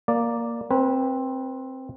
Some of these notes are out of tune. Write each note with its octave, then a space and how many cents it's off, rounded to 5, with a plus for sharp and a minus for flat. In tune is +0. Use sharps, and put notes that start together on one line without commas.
A#3 +0 D5 +0
C4 +10 B4 -20 G#5 -25